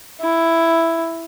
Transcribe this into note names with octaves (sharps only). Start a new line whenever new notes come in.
E4